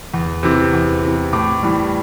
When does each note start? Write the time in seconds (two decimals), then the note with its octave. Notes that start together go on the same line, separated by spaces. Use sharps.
0.14 E2
0.43 C3 E3
0.73 E2
1.03 C3 E3
1.33 A2 D6
1.63 E3 G3